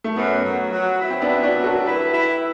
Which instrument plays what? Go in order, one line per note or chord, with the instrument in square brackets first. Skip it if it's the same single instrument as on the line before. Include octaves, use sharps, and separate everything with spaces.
[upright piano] A3
[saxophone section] F#2 [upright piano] B3
[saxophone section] F#3
F#3
E4
[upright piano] C4
B3 D4
[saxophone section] E4
[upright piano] D4 F#4
[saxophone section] F#3
[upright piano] F#4 A4
[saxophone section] E4 [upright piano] G4 B4
[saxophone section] E4